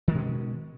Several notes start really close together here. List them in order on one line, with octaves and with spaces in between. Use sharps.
D#3 G#3 B2 C#4